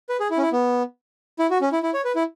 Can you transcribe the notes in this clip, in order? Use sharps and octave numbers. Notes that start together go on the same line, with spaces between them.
B4
G#4
E4
C#4
E4
B3
E4
F#4
C#4
E4
E4
C#5
B4
E4